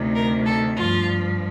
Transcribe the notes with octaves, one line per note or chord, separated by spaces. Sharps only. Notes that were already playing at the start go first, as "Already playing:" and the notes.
Already playing: D2 C3 D#3
A#4
A4
G2 F3 F4